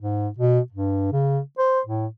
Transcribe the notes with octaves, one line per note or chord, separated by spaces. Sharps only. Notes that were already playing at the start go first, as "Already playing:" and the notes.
G#2
B2
G2
C#3
C5
A2